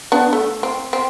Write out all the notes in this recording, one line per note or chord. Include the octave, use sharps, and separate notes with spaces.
B3 D4
A3
C4
C4